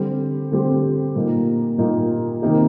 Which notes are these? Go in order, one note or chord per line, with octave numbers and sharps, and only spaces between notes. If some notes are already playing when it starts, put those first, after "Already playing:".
Already playing: D3 G3 C4 G4
D3 G3 C4 G4
A#2 G3 A#3 D#4
A#2 G3 A#3 D#4
C3 D#3 A#3 D#4 G4